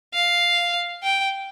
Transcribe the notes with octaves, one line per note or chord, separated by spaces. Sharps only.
F5
G5